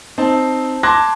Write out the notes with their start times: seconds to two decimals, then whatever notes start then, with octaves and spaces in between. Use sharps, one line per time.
0.18 C4 D#4 A5
0.83 A5 C6 D6 F#6 G#6 A#6